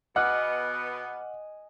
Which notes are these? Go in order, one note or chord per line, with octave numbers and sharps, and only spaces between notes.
B2 B3 D#5 F#5 G#5 D6 F6 F#6